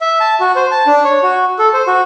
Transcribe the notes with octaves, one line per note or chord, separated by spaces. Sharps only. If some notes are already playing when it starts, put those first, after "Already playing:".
E5
A5
F#4
C5
A5
D4
C#5
F#4
A4
C5
F#4